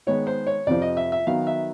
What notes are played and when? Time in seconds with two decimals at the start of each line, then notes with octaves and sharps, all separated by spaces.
0.07 D#3 G#3 B3 C#5
0.27 C5
0.47 C#5
0.67 F2 C3 F3 D5
0.82 D#5
0.97 E5
1.12 E5
1.27 D#3 F#3 B3 F5
1.47 E5